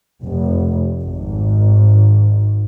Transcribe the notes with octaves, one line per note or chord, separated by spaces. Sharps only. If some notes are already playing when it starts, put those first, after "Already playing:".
F1
G#1